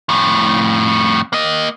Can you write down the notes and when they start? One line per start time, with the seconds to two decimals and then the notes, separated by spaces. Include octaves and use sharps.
0.09 F2 A2
1.33 A#3 D#5